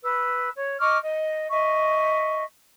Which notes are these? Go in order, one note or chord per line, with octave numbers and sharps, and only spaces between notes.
B4 E6
C#5
D#5 C#6 D6 F6
D#5
D#5 E5 C#6